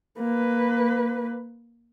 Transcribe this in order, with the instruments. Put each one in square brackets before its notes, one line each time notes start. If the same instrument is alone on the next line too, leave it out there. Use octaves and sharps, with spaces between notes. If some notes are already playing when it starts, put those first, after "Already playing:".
[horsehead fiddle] A#3 B4